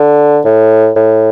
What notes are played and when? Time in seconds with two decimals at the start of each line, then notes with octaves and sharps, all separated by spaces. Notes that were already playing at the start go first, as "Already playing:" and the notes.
Already playing: D3
0.45 A2
0.96 A2